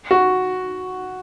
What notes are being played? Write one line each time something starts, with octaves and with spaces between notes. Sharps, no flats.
F#4